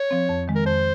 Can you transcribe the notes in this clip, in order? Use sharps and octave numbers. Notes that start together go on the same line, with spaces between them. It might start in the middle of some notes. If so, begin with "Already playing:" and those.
Already playing: C#5
F3 C4
F2
D#3 G#3
A#4
F2 C5